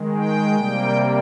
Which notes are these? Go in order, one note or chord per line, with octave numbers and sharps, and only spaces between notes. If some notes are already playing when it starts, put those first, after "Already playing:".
Already playing: D#3 G#3
G5
C3 G3 A#3